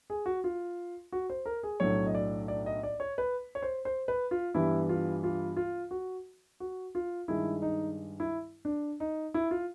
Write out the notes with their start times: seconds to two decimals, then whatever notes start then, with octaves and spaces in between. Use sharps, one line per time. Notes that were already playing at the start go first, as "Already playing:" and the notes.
0.10 G#4
0.26 F#4
0.44 F4
1.12 F#4
1.30 C5
1.46 A#4
1.63 G#4
1.80 B1 A2 F#3 A3 D4 C#5
2.06 D#5
2.15 D5
2.48 D5
2.66 D#5
2.83 D5
3.00 C#5
3.18 B4
3.55 C#5
3.62 C5
3.85 C5
4.08 B4
4.31 F4
4.54 G2 E3 G3 B3 E4
4.89 F4
5.23 F4
5.57 F4
5.91 F#4
6.60 F#4
6.95 F4
7.28 G2 D#3 G#3 E4
7.62 D#4
8.20 E4
8.65 D4
9.00 D#4
9.34 E4
9.51 F4